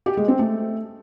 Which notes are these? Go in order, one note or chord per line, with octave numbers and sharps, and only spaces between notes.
G4
G#3
C4
A3